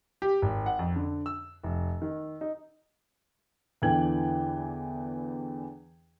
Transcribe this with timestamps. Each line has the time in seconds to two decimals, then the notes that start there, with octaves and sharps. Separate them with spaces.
0.22 G4
0.42 G#1
0.66 F#5
0.79 F2
0.96 D3
1.26 E6
1.64 F1
2.02 D#3
2.41 D#4
3.82 E2 D3 E3 G5 G#6 F#7